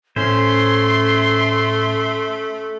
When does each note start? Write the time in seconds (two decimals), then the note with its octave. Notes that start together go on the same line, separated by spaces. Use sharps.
0.16 A2 A3 C#4 C5 C6